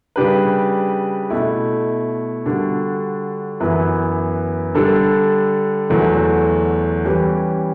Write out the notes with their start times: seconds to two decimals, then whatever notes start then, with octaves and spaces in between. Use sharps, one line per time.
0.16 C#3 G3 D4 G4 B4
1.30 B2 A3 E4
2.46 D3 G3 D4 F#4
3.60 F#2 E3 B3 E4 B4
4.74 D3 G3 D4 A4
5.89 E2 D3 F#3 A3
7.05 E3 G3 C#4 E4 G4